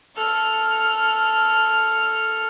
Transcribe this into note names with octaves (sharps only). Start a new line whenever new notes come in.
A4 F6